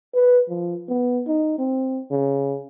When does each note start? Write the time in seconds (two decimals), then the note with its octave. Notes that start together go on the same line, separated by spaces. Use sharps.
0.14 B4
0.49 F3
0.89 B3
1.27 D#4
1.59 C4
2.11 C#3